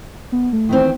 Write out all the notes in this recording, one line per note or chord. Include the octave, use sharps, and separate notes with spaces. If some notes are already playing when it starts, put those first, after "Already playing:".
B3
A3
D#3 E3 C4